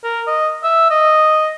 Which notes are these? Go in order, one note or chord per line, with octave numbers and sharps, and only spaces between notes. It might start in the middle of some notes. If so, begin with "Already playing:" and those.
A#4
D#5
E5
D#5